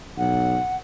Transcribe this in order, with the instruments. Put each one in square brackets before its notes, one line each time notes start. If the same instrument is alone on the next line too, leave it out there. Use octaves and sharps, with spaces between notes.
[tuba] B1 [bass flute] F#5